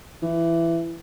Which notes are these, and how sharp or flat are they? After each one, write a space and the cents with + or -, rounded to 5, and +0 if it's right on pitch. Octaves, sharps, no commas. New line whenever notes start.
E3 +15